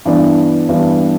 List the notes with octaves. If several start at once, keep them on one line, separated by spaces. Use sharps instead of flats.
G2 E3 B3 D4 D5
G2 E3 G3 B3 D4